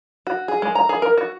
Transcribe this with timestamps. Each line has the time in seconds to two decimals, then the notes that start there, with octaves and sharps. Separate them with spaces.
0.27 F#4
0.48 G#4
0.62 G#3
0.75 A#5
0.89 G#4
1.02 A#4
1.18 F#4